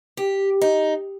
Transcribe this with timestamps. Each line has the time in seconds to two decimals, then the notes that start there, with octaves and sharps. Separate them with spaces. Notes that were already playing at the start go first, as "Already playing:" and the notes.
0.17 G4
0.62 D#4